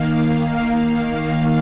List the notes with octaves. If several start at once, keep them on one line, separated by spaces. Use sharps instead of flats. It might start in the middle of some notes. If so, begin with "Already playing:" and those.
Already playing: D#3 A#3 F5
F5